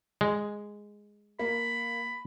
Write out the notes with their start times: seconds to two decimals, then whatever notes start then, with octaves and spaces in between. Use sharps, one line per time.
0.21 G#3
1.39 A#3 B5